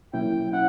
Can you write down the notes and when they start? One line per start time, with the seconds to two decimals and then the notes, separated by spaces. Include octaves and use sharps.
0.13 B2 F#3 A#3 C#4 E4 G5
0.53 C#4 E4 F#5